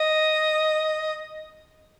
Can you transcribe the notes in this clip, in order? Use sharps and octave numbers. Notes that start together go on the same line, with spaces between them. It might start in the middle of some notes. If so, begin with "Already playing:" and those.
Already playing: D#5